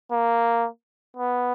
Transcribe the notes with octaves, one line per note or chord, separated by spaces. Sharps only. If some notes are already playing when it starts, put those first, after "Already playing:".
A#3
B3